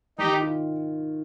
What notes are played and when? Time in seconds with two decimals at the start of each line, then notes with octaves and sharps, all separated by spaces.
0.18 D#3 D#4 G4
0.42 F4